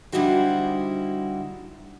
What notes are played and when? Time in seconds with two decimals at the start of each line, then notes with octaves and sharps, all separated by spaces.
0.12 D3 G3 D#4 E4 F#4 C5